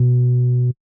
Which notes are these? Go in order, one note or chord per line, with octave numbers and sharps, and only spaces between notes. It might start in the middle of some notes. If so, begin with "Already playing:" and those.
Already playing: B2